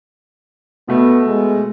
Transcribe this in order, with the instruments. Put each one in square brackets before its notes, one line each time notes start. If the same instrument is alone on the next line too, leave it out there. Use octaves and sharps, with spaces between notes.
[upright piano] B2 A3 [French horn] B3
[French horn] G#3